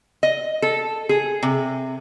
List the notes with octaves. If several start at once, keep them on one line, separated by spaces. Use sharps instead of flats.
D#5
A4
G#4
C3